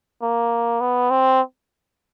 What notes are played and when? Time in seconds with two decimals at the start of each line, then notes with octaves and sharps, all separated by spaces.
0.22 A#3
0.81 B3
1.10 C4